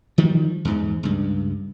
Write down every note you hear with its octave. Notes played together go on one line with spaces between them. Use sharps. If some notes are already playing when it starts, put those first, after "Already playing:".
D#3 F3 G3
E2 G#2
C#2 G2